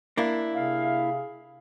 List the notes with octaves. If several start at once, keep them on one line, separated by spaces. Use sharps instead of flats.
A#3 D4 E4
C3 G#4 F5